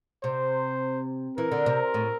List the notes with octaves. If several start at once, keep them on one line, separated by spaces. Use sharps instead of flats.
C3 C5
E3 A#4
D3
C3
A2